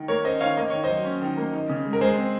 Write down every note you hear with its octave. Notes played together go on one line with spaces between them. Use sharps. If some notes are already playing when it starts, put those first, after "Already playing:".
Already playing: D#3
A#3 A#4 C#5
C#4 C5 D#5
D#3 C#5 F5
A#3 D#5
D#3 C#5
C5 D#5
F#3
C#4
D#3
A#3
D#4
C#3
G#3
A#4
G#3 G#4 C5
C4